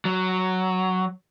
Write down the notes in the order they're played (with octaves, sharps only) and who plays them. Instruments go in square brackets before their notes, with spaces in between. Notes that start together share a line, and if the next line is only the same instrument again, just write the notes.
[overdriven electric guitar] F#3